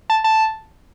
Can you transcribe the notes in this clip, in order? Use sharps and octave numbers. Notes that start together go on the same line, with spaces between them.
A5
A5